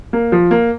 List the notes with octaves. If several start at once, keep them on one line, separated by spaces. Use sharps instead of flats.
A#3
F3
A#3